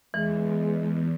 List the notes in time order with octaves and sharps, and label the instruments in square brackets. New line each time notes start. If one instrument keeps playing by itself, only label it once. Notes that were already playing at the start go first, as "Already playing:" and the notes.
[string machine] E2 [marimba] E3 [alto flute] G#3